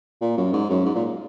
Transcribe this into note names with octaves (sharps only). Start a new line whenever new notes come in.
A#2
F#2
G#2
F#2
G#2
A#2